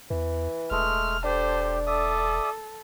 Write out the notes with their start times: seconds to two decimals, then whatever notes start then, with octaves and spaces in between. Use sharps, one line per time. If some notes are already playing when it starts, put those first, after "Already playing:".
0.11 E2 E3
0.71 E1 G#3 A3 F6
1.24 D4 G4 A4 C5
1.87 A4 D5 E5 D#6